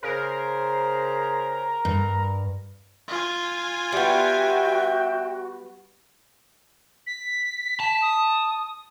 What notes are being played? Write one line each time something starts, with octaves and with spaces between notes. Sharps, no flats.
C#3 G#4 A#4 C5
G2
F4 G#5
G3 B3 F#4 E5 G5
B6
A5
D#6